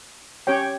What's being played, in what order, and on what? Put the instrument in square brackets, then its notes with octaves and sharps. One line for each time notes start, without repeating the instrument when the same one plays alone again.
[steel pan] C#4 G4 C#5 G5